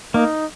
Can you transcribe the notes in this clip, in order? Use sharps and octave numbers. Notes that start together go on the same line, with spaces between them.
A#3 D#4